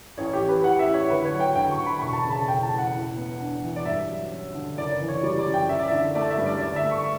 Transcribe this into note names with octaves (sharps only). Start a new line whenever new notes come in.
A1 C#5
G4
E3
B4
A1 F#5
E5
A2
C#5
D2 B4
C#5
F#3
G5
D2 G5
C#6
D3
B5
E1 C#6
A5
B5
C#3
A5
E1 G5
A5
E2
F#5
A2
B3
D4
E3
D5
G2 E5
F#3
C#4
D3
F#1 D5
D5
E3
C#5
G3 D5
D5
F#2
G5
A1 E5
D5
D3 E5
A3 D5
E5
G2
D5
D2 D5
E5
A3
C#6